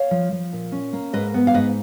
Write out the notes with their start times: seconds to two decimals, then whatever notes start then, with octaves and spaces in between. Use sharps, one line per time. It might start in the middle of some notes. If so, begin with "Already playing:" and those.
Already playing: C#5 F5
0.11 F3
0.32 F3
0.53 A#2
0.72 C#4
0.93 A#3
1.13 G#2 B4 D#5
1.34 B3
1.47 F5
1.54 G#2 B4 D#5